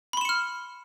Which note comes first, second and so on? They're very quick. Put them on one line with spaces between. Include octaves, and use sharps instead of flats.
B5 C6 E7 C#7 F6